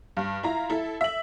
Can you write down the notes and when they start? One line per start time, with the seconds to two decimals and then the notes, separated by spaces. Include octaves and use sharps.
0.17 G2
0.43 E4 F4 A#5
0.70 E4 A4
1.01 E5 F#7